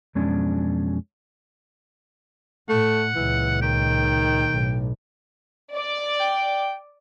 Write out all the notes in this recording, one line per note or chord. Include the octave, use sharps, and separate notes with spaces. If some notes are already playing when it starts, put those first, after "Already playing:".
F2 B2 F#3 G#3 C#4 D4
A2 A3 F#5
C#2 A#2 E3
D#3 G5
B1 A2
D5
G5